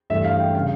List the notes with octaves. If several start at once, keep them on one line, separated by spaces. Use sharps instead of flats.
G2 E3 A3 E5
F5
G5
C#3 G3 D4 F5